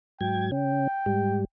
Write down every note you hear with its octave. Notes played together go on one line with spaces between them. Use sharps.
G#2 F#3 G5 G#6
C#3 C#4 G5
G#2 G3